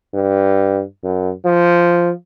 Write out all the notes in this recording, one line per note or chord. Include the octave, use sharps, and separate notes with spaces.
G2
F#2
F3